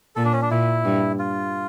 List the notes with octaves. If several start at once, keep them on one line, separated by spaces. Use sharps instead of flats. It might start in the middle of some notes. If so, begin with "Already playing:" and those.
A#2 A4
D4
C#4
D4
A#2 E4
G2
F4